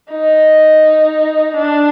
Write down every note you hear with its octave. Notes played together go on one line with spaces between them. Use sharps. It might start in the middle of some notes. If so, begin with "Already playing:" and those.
D#4
D4